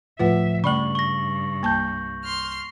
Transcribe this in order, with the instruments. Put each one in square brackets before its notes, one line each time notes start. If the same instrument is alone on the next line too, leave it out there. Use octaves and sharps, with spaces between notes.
[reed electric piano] D2 A2 F3 [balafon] F4 B4 F#5 [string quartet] E5
[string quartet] G2 [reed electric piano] C#3 [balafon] A3 D5 B5 [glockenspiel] C#6 F#7
[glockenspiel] C#6 A#6
[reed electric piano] C2 G6 [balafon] A#3 A5
[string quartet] C6 F6